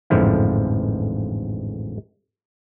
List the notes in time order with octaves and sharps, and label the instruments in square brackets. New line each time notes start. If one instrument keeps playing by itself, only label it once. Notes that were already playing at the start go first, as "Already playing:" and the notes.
[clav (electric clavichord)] A1 F2 G#2 D3 F3 E4